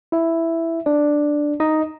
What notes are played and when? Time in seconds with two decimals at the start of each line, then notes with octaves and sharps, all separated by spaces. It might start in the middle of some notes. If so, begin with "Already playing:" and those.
0.12 E4 E5
0.86 D4 D5
1.60 D#4 D#5